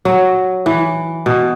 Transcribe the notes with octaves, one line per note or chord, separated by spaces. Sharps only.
F#3
E3
B2